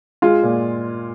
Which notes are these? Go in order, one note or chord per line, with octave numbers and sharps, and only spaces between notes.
G#3 F4
A#2